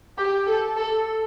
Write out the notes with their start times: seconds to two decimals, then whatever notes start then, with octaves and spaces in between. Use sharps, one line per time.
0.18 G4
0.47 A4
0.76 A4